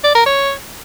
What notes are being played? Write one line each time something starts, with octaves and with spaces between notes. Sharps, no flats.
D5
A#4
C#5